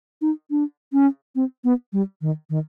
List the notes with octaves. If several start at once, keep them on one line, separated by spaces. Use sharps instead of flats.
D#4
D4
C#4
C4
B3
G3
D#3
D#3